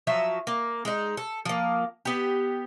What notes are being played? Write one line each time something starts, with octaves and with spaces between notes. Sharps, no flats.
F3 F#3 E5
A#3
G#3 D#4
A4
F3 A#3
B3 G4